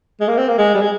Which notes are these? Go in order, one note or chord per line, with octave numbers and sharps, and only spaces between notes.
G#3
A#3
C4
A#3
G#3
G3
G#3